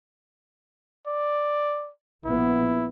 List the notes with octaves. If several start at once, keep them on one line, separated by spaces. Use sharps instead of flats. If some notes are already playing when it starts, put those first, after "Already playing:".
D5
A#1 B3 E4